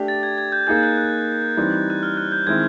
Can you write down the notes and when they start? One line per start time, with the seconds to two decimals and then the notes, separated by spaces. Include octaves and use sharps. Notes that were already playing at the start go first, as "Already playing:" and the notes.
Already playing: A3 D4 G4
0.08 A6
0.23 G#6
0.38 G#6
0.52 G6
0.67 A#3 D#4 G#4 G6
0.83 F#6
0.98 F#6
1.57 E3 G3 C4 D#4
1.90 F#6
2.03 F6
2.17 F#6
2.32 G6
2.47 D#3 G#3 C4 E4 G#6